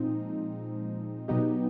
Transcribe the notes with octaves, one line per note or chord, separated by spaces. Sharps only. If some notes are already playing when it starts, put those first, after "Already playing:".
Already playing: A#2 F3 G#3 C4 D#4
B2 F#3 B3 D#4 G4